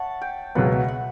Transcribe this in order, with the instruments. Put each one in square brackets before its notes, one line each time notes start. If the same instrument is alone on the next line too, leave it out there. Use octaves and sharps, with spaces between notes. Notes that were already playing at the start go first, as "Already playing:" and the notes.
Already playing: [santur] C#5 E5 F#5 A5
G5
[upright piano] C#2 B2 F#3 B3 [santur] F#5
[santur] E5
F#5